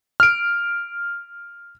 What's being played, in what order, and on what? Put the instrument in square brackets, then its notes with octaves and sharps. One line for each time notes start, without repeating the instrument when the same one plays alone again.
[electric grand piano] F6 D7